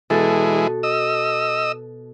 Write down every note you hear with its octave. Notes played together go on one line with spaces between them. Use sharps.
B2 E3 G#3 A4
D#5 E6